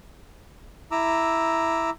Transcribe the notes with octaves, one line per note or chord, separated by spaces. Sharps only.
E4 A#5 D6 E6